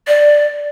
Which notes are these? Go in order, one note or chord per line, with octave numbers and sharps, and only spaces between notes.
D5